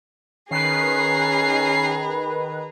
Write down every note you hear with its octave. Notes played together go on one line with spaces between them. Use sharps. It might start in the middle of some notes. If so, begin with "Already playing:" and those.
D#3 C#4 G#4 B4 A#5 C7